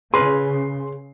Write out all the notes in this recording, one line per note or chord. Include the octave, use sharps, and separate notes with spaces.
C#3 G#4 B4 C6